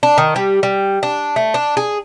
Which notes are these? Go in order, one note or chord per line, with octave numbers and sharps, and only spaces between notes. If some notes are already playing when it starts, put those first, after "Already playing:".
D4
D#3
G3
G3
D4
A3
D4
G#4